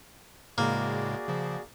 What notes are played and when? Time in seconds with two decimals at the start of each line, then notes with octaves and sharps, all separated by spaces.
0.58 A2 C#3 G#3 A#3 F#4 G#4 D5
1.27 C#3 F3